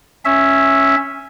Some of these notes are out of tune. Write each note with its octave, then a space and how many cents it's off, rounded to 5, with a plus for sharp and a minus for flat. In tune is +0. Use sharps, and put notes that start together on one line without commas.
C#4 -5 E5 +0